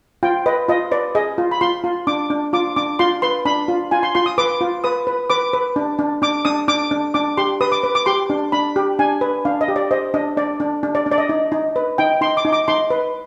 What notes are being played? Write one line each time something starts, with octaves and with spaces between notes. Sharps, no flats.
F4 G5
B4 D#5
F4 D#5
B4 D5
G#4 D#5
F4
B5
F4 C6
F4
D4 D6
D4
F4 D6
D4 D6
F4 C6
B4 C6
D4 B5
F4
F4 G#5
C6
F4 C6
D#6
B4 D6
F4
B4 D#6
B4
B4 D6
B4
D4
D4
D4 D6
D4 D#6
D4 D6
D4
D4 D6
G4 C6
B4 D#6
D6
B4
D6
G4 C6
D4
D4 B5
G4
D4 G#5
B4
D4 F5
D#5
G4
D5
C5 D#5
D4 D#5
D4 D5
D4
D4
D5
D4
D5
D#5
D#4
D#4
B4
D#4 G5
D#4 C6
D6
D#4
D6
D#4 C6
B4